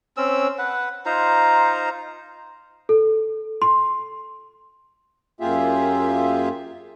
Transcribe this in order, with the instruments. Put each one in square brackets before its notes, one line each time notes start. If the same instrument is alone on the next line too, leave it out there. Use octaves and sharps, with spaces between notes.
[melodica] C4 C#4 E6
B4 F#5
D#4 F4 C5 A#5
[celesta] A4
C6
[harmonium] F#2 A#3 F4 G4 G#4 E5